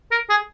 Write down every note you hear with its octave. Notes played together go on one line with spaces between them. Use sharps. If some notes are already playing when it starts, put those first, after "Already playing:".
A#4
G#4